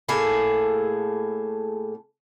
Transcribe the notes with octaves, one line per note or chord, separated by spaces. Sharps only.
A2 A#3 G#4 A4